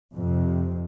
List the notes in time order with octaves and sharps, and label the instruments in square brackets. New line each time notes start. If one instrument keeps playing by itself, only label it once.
[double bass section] F2 C3